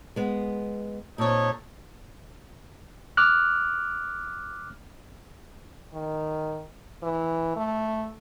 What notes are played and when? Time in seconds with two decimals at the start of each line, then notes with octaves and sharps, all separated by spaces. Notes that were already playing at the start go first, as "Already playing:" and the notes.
0.16 G#3 B3
1.18 A#2 C4 D#4 A4 C#5
3.17 D6 F6 F#6
5.93 D#3
7.03 E3
7.56 A3